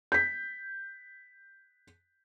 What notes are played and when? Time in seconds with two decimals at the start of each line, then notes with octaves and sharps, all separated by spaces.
0.12 G6 B6